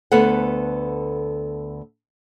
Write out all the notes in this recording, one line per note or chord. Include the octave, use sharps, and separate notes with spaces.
D2 B3 A4 B4 F5 F#5